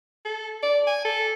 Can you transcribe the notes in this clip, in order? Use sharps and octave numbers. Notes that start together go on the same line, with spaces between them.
A4
D5
G#5
A4